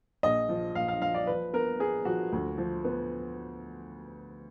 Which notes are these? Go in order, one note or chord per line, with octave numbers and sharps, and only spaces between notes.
A#1 D#5
F3
A#1 F5
F5
F3 F5
D5
F3 B4
B3 A#4
B3 G#4
F3 F#4
D2
F3
B3